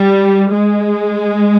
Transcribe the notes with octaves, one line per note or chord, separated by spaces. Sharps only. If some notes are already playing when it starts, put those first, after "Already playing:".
Already playing: G3
G#3